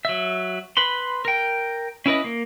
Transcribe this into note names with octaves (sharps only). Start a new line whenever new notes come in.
F#3 E5
B4 B5 C6
A#4 G5
C#4 E4 B4 D#5
A#3